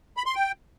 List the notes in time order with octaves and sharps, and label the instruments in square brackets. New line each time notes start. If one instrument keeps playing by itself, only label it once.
[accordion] B5
C6
G5